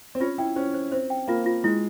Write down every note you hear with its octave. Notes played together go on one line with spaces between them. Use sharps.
C4
C#4 F4
E4 G5
C#4 C5
C5
C4 C5
G5
A#3 F4
F4
G#3 E4